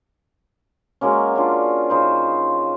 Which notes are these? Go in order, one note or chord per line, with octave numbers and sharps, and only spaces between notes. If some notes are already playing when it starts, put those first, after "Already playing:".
F#3 G#3 A#3 C#4
C#4 D4 F4
C#3 D#4 C5